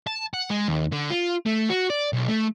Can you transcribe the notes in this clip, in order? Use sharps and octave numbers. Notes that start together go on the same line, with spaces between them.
A5
F#5
G#3
D#2
D3
F4
A3
F#4
D5
B1
A3